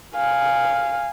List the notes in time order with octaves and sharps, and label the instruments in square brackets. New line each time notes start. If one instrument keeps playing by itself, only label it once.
[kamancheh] F5 G#5